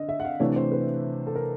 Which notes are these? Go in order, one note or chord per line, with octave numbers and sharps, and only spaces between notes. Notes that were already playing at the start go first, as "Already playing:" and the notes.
Already playing: D3 D#5
E5
F#5
F5
C3 E3 A3 D4 C#5
C5
B4
A4
A#4